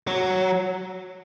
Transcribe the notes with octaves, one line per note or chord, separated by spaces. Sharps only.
F#3